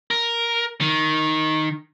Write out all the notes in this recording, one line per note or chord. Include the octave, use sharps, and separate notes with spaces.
A#4
D#3